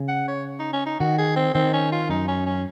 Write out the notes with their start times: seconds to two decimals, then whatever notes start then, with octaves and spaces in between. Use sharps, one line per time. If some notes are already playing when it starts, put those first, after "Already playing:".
Already playing: C#3
0.09 F#5
0.28 C#5
0.60 D#4
0.73 C#4
0.86 D#4
1.00 D#3 F#4
1.18 G#4
1.36 C4
1.54 D#3 C4
1.74 C#4
1.92 F4
2.09 F#2 D#4
2.28 C#4
2.46 C#4